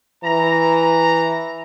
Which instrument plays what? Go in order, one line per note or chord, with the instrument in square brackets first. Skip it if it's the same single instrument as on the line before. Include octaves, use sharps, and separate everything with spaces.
[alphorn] E3 [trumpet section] A#5